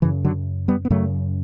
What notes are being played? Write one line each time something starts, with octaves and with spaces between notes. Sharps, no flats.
F#2 C#3 E3
D3 F#3
G3 B3
B3
F#2 C#3 F#3 A3